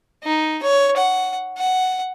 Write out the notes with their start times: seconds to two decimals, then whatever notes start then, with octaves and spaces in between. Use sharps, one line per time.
0.23 D#4
0.63 C#5
0.97 F#5
1.57 F#5